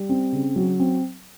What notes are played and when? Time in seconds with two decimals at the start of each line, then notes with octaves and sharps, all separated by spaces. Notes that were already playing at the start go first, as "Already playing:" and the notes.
Already playing: G3
0.09 C4
0.32 C#3
0.56 F#3
0.80 C4